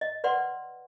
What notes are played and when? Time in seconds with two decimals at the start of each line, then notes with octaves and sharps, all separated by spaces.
0.01 D#5
0.24 B4 D5 F#5 C6